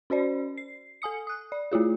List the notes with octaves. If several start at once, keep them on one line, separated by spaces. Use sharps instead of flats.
C#4 F#4 C5 D5
C7
A4 G#5 D#6 C#7
D#6 F#6
D5
A3 E4 F4 G#4